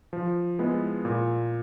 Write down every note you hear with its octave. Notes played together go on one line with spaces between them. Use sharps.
F3
G#3 B3 E4
A#2